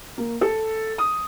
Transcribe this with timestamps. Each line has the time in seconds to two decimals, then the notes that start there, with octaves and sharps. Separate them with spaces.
0.18 A#3
0.41 A4
0.98 D#6